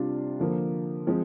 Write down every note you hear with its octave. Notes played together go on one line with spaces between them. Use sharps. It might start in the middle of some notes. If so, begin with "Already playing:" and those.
Already playing: C3 G3 D4 F4
D3 F3 A#3
F3 G#3 C4